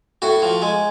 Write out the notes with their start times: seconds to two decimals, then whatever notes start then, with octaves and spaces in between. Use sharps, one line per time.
0.22 A2 F#4
0.42 F3
0.62 G#3